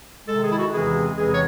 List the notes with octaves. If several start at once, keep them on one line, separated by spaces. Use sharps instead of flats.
C3 D#3 G#3 A4
G#4
E4
F#4
E2 C3 E3 G#3 C4 G#4
E2 C3 E3 G#3 C4 G#4
C#5